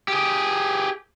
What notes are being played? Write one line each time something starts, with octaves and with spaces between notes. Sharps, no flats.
G4 G#4